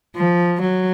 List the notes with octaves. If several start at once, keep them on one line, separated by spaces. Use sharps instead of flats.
F3
F#3